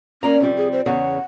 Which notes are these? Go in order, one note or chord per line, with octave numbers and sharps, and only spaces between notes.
A#3 C#4 D5 A#5
F2 C3 G3
G#4
C5
E2 C#3 C#5 F#5